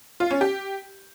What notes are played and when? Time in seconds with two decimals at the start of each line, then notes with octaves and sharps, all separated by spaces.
0.20 F4
0.31 C#4
0.41 G4